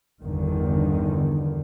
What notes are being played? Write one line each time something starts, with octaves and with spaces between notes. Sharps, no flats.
G1 E2 D3 D#3